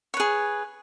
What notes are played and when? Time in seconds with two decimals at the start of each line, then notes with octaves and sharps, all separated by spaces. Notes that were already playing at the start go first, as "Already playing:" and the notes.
0.14 C#5
0.17 B4
0.20 G#4